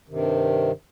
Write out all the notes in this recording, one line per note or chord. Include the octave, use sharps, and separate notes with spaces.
G2 C3 D#3